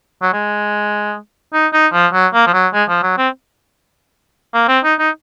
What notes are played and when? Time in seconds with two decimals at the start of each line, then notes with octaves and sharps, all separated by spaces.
0.22 F#3
0.33 G#3
1.53 D#4
1.73 D#4
1.93 F3
2.13 F#3
2.34 A#3
2.47 F3
2.53 F#3
2.74 G#3
2.89 F3
3.03 F#3
3.18 C4
4.54 A#3
4.69 C4
4.84 D#4
4.99 D#4